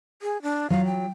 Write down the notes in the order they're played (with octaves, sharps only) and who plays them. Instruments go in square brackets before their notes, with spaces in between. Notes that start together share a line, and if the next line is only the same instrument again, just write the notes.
[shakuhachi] G#4
D4
[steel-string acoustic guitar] F#3 F4 [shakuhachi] F5
[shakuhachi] G5